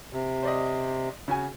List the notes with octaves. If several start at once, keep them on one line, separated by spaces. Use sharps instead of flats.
C3
C5 D5 D#5
C#3 F#4 G#5